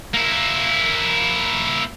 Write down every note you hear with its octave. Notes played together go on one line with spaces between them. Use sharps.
A#3 E4